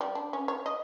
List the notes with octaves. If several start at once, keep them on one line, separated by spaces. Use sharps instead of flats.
G3
D4
C#4
C#5
D#5